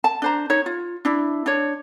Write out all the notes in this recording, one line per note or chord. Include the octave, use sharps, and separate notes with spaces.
A5
D4 C5 A#5
D#4 C#5
F4
D4 E4
D4 C#5